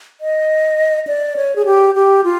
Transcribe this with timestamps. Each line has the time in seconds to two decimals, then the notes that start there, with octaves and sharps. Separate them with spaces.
0.21 D#5
1.07 D5
1.36 C#5
1.56 G#4
1.65 G4
1.95 G4
2.24 F4